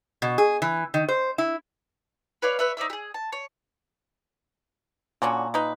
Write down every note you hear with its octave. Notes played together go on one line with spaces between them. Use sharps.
B2
G#4
E3
D#3
C5
E4
B4 C#5 D5 F5
B4 C#5 E5
D#4 C5 D5 E5
G4 G#4
A5
C#5
A#2 D3 C#4 F#4
D#4 B4